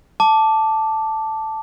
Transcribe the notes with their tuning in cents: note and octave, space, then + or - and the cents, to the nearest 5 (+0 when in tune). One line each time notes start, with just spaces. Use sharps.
A5 +0 D6 +0